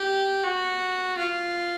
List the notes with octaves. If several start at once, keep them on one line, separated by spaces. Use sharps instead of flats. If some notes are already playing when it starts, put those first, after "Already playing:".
Already playing: G4
F#4
F4